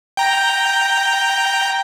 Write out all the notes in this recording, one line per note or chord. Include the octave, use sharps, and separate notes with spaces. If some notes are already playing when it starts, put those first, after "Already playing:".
G5 A#5